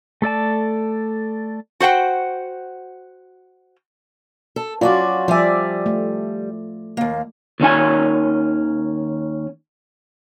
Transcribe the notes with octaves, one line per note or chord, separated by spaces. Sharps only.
A3 A4 D5 A5
F#4 C5 F#5 G5
A4
F#3 C#4 F4 F#4 D5
F3 G3 D5 E5 G#5
A3
D#2 A#3
D#2 D#3 C#4 G#5